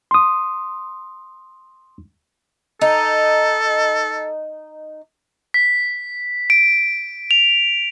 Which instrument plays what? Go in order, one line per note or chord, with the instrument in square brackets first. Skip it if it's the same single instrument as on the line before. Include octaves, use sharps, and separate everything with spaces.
[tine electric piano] C6 D#6
[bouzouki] D#4 [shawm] A4
[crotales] B6
D7
F7